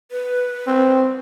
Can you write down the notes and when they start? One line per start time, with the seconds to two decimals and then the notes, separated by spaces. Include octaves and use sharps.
0.11 B4
0.67 C4